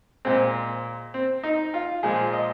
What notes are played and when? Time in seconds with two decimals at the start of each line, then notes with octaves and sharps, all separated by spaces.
0.25 A#2 G#3 C4
1.14 C4
1.44 D#4
1.74 F4
2.03 A#2 F3 G#3 G#4
2.33 D#5